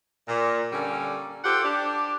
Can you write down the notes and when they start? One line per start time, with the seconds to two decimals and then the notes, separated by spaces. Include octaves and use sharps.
0.28 A#2
0.72 D3 G3 A#3 C#4
1.44 F4 G4 A4 C5 F#5
1.64 D4 G4